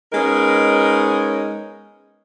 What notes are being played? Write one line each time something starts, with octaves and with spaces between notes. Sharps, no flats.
G#3 B3 C#4 D#4 A#4 D#5